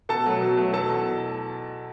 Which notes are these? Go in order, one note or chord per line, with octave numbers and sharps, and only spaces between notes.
B2 A4 A5
F#3 A3
B2
F#3 A3
E2 A4 A5
B2